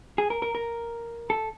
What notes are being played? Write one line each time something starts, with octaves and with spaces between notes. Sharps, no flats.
G#4
A#4
A#4
A#4
A4